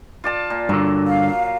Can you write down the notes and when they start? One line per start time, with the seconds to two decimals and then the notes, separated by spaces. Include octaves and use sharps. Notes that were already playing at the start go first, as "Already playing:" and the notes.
0.24 F4 D5 A5
0.50 A#2
0.69 G2 D3 F#3
1.06 F5